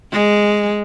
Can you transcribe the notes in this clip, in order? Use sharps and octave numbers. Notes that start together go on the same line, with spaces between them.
G#3